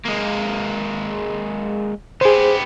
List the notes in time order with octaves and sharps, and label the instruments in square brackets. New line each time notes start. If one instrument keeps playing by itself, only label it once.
[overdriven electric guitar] G#3 A#3
[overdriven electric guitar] B3 G4 [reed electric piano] G#4 C5